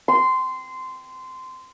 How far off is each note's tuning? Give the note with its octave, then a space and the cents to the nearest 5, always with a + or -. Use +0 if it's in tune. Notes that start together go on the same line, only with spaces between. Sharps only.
C6 -15